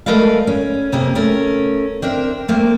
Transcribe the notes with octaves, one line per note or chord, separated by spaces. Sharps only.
G#3 A3 A#4 B4 D5 F5
C#4
F2 C3 A#3 G#4 A#4
A3 C#4 A#4
C4 D4 A#4 E5
A3 A#3 C4